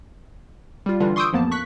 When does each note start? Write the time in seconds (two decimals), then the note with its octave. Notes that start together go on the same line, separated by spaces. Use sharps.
0.86 G3 F4
1.00 D3 E3 G3 D4 F4
1.16 C6 C#6 D#6 E6 G6 D7
1.32 A1 F2 F3 A#3 B3 A5
1.51 C#6 F#6 B6